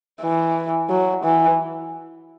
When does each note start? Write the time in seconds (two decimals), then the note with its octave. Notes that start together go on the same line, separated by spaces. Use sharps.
0.22 E3
0.90 F#3
1.24 E3